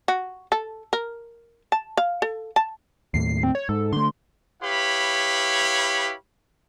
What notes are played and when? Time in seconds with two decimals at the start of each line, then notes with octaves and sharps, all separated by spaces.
0.08 F#4
0.52 A4
0.93 A#4
1.72 A5
1.97 F5
2.22 A4
2.56 A5
3.14 D#2 A2 C7
3.43 C4
3.55 C#5
3.69 G#2 A4
3.93 D3 A3 C6
4.62 E4 G4 B4 C#5 F5 B5